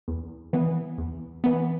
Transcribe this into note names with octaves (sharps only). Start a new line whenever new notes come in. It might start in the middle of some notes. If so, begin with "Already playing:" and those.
E2
E3 B3
E2
E3 B3